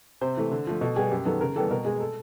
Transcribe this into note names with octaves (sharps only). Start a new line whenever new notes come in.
C3 C5
E3 A3
D3
F3 A3
B2 A4
G3 B3 G#4
F#2 G4
D#3 F#3 B3 A4
C#3 A#4
E3 G3 B3 A4
B2 A#4
G#3 B3 G#4
A4